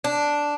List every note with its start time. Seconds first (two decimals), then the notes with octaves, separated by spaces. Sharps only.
0.04 D4